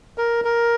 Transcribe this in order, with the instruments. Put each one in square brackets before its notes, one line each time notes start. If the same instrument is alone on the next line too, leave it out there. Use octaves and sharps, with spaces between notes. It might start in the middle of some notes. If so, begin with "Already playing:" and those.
[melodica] A#4
A#4